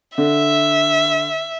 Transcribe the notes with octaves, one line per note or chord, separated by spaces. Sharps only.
D3 E5